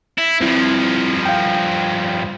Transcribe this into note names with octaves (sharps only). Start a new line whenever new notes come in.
E4
G2 F3 C4 E4
F5 G5